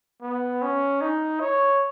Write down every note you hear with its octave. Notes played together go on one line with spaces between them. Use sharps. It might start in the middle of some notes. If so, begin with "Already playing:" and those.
B3
C#4
D#4
C#5